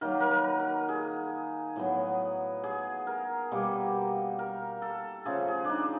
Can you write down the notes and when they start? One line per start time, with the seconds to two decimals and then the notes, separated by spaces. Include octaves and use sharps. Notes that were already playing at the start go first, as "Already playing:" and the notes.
0.01 D#3 F#3 A#3 A#4
0.20 A#4
0.31 B4
0.59 A#4
0.89 G#4
1.76 A2 F#3 B3
2.64 G#4
3.07 A#4
3.51 B2 G3 A#3
4.39 A#4
4.82 A4
5.25 C#3 F3 A3 G#4
5.48 G#4
5.65 D4 D#4